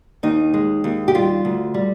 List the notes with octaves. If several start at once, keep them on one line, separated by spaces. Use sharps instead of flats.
D#2 D#4
G#3
D#2
G4
G3 F4
D2
G3